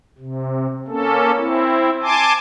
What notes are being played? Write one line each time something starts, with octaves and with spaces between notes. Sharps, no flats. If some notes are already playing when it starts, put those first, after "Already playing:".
C3
A#3 C#4 A4
C4 E4
G#5 A5 C6 D6